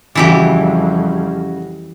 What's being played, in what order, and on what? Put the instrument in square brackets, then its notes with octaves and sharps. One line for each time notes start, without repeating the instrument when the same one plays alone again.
[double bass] F2 G3 [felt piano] C#3 F#4 [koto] E3 E4 G4